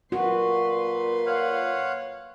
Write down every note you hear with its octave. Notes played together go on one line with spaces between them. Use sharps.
A#2 F#4 B4 C6
C#5 F5 F#5